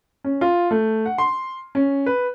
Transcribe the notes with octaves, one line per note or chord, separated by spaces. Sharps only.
C#4
F4
A3
F#5
C6
C#4
B4